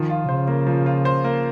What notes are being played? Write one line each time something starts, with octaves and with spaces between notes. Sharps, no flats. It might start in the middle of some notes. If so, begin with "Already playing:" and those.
Already playing: D#3 F3
F4
C#3 C5
A#3
F3
F4
C5
A#3